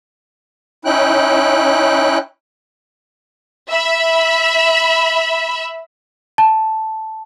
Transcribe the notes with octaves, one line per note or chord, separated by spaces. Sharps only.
C#4 D#4 E4 G5 F#6
E5 B5
A5